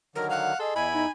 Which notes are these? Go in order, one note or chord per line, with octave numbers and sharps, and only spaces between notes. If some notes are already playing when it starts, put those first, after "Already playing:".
D3 D#3 F#3 A#4
F5 F#5
G#4 A4 D#5 C6
E2 E4 G#5 B5
D#4